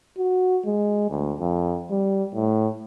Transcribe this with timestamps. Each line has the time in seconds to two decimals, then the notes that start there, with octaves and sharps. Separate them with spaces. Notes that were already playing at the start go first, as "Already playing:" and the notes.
0.18 F#4
0.65 G#3
1.10 D2
1.40 F2
1.91 G3
2.35 A2